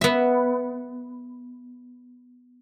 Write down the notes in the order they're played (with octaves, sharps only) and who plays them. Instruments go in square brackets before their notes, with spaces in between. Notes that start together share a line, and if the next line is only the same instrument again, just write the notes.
[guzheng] B3 E5